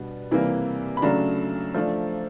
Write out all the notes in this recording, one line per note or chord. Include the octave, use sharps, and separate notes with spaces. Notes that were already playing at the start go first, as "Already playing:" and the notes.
Already playing: B2 G3 B3 D4
C3 E3 G3 A#3
B5
C#3 F#3 A3 D4 A#5
F3 A3 D4